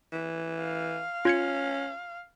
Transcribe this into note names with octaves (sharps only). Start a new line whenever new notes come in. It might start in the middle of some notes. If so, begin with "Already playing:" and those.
E3
F5
C#4 F4 G#6 C#7